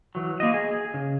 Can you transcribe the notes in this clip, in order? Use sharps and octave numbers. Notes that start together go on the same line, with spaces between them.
E3 F#3
A#3 D#5
G#4
C#3